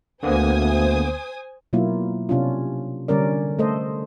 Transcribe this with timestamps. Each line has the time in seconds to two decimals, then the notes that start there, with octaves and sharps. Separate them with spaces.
0.23 D2 D3 A#3 B3 C5 G#5 D#6
1.73 B2 F#3 A#3 E4 F4
2.29 C3 C#4 D4 F4
3.08 D3 G3 C#4 A#4 D5
3.59 A3 A4 C5 D#5